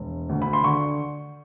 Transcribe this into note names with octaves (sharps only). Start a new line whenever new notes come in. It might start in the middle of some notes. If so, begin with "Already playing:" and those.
Already playing: E1
D2
B5
C6
D3 C#6